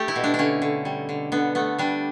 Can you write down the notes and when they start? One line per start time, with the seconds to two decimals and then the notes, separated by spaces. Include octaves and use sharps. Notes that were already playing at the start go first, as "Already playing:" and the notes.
Already playing: A3 G4 A4
0.08 E4
0.16 B2
0.24 D4
0.34 D4
0.39 D3 C#4
0.62 D3
0.85 G3
1.09 D3
1.32 D3 B3
1.55 A3 B3
1.79 G3 D4